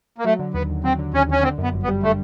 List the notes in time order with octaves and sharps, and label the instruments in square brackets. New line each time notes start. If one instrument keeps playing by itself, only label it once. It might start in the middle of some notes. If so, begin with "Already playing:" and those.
[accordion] A#3
[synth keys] F#3 [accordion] A3
[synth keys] D3
[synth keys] D#2 [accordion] B3
[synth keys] D#2
[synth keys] F#3 [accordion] C4
[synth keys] D3
[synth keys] D#2 [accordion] C#4
[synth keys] D#2 [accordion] C#4
[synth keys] D3 [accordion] C4
[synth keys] F#2
[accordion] B3
[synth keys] G1
[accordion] B3
[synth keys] G3
[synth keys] D3 [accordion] A3